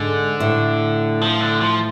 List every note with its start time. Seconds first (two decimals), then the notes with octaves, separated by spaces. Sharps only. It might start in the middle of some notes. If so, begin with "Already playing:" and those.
Already playing: G#2 D3
0.40 A2
1.21 F3
1.40 D3
1.61 F3